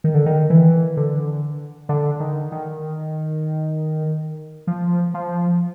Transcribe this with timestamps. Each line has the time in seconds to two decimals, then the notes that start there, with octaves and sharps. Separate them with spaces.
0.04 D#3
0.14 D3
0.26 D#3
0.50 E3
0.97 D3
1.89 D3
2.20 D#3
2.52 D#3
4.67 F3
5.14 F3